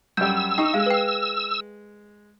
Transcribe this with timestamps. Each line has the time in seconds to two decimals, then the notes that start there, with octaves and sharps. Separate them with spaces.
0.17 F#2 G3 E6 G6
0.58 D#4 G5 C#6
0.74 G#3 F5
0.86 B4 G5